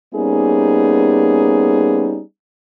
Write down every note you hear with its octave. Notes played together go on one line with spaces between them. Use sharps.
G3 A#3 B3 C#4 D#4 G#4